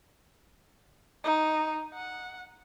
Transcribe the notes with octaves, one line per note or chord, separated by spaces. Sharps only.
D#4
F#5